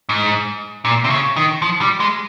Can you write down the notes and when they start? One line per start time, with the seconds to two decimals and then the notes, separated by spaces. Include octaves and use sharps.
0.09 G#2
0.85 A#2
1.04 C3
1.10 C#3
1.36 D#3
1.62 F3
1.81 G3
2.00 G#3